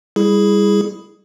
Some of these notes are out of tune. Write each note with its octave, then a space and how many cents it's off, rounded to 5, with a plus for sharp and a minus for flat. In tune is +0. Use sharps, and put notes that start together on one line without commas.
G3 +25 E4 +0 G#4 +5